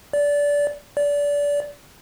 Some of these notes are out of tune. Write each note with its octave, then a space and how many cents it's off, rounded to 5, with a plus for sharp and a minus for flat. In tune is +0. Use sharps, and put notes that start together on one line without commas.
D5 -20
D5 -25